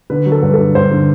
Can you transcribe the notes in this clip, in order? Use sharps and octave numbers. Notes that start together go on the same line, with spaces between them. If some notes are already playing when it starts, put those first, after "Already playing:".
D3 B4
F#3
A4
G2 B4
D3 A4
G2 C5
D3